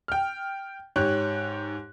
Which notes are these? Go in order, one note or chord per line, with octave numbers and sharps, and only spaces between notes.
G5 F6
G#2 G4 C#5 F#6